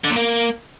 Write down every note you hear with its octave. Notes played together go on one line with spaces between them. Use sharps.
D3
A#2
A#3